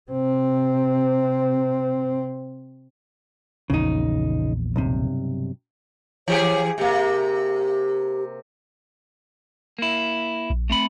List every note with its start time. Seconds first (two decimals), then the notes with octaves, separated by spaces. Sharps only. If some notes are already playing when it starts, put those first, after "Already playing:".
0.11 C3 C4
3.70 A#1 E2 A#2 C#3 D#4
4.76 B1 G2 C3
6.28 E3 G4 G#4 C#5
6.78 C3 A#3 G4
9.79 A#3 E4
10.50 A#1
10.70 A3 C4 B5